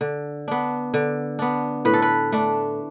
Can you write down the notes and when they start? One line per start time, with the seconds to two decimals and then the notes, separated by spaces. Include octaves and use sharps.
0.01 D3
0.48 B3 D4
0.94 D3
1.39 B3 D4
1.85 A2 B4
1.93 A4
2.02 B4
2.32 A3 D4